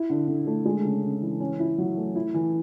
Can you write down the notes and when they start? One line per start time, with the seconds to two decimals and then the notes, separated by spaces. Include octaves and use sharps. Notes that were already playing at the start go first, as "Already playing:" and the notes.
Already playing: E4
0.10 D3
0.28 D3
0.47 A3
0.65 G#3
0.84 C#3
1.03 C#3
1.22 E3
1.40 C#4
1.60 E4
1.78 F#3
1.97 A3
2.15 E4
2.34 E3